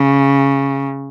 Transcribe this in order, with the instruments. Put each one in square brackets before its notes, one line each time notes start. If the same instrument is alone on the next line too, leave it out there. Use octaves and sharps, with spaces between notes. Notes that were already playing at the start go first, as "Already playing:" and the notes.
Already playing: [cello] C#3